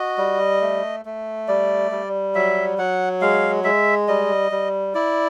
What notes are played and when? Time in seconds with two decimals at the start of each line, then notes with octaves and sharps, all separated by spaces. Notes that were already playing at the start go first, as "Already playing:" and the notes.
Already playing: F#4 D#5
0.18 G3
0.61 A3
1.05 A3
1.48 G3 D5
1.91 G3
2.35 F#3 E5
2.78 F#3 F#5
3.21 G#3 F5
3.64 G#3 E5
4.08 G3 D#5
4.52 G3
4.95 E4 D5